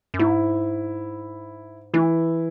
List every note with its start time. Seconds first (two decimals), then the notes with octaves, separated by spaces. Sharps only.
0.14 F#2
0.19 G#2 E4
1.94 E3 E4